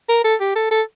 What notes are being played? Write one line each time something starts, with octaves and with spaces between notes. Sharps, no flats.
A#4
A4
G4
A4
A4